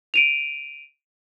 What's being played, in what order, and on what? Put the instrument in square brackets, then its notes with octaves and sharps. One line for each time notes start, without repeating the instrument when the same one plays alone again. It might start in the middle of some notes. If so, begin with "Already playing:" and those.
[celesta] D7 D#7 F7